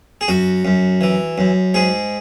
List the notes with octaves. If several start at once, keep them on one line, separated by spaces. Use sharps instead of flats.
G#4
F#2 F#4
F#2
E3
F#2
G#2 G#4